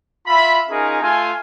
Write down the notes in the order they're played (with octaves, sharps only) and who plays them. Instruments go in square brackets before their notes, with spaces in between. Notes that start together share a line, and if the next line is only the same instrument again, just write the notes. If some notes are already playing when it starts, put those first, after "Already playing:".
[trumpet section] F4 E5 B5
C#4 D#4 F4 G#4 A#4
A3 F4 G#5